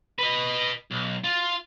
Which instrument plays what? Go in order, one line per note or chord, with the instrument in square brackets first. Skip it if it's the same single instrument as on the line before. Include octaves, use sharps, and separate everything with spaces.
[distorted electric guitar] B4 D#5
B1
F4